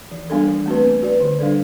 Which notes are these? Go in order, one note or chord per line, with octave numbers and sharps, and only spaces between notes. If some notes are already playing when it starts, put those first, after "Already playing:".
E3
G3 B3 D4 A4
E3
A3 C4 F#4 B4
B3
F#4 B4 D5
D3
G3 D4 A4 D5